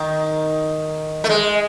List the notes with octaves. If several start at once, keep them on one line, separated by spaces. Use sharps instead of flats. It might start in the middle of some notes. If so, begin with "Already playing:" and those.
Already playing: D#3
A3
G#3